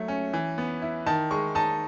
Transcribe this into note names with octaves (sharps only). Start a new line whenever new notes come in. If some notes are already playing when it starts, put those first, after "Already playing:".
Already playing: F#3 A3
C#4
E3
B3
E4
D#3 A5
G#3 C#6
D#4 A5